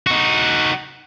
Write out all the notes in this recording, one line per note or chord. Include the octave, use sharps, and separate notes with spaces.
D#4 F#4